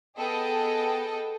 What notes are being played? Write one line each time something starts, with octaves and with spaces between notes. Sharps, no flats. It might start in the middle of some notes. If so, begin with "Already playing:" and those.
B3 G#4 A4 D#5 G5 A5